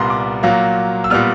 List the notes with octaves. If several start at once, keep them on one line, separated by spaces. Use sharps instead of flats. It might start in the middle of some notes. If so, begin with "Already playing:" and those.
Already playing: C2 A#2 G3 B3 A#5 C6
D6
A#2 F#3 A#3
E6
A#2 G3 B3 F6